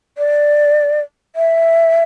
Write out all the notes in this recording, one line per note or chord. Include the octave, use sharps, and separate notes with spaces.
D5
E5